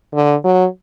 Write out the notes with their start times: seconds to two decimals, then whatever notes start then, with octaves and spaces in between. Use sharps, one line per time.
0.14 D3
0.44 F#3